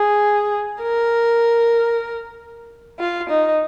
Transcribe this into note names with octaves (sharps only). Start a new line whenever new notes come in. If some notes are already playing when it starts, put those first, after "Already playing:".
Already playing: G#4
A#4
F4
D#4